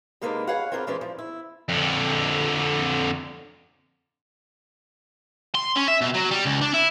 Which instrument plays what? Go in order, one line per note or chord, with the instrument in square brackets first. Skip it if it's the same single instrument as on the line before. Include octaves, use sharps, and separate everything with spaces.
[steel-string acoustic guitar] C3 G#3 A#3 D4 D#4 B4
G#4 B4 C#5 F5 F#5
C4 C#4 F4 G#4 A#4 D5
E3 G#3 C#4 D4 B4 C5
F3
E4
[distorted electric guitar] F2 D3
C6
C#4
E5
B2
F#3
G3
C#2
D4
E4